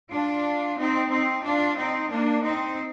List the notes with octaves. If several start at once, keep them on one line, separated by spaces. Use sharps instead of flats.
D4 F4
C4 D#4
C4 D#4
D4 F4
C4 D#4
A#3 D4
C4 D#4